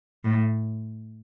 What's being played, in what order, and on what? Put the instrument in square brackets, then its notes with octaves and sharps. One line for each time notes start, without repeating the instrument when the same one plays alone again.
[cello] A2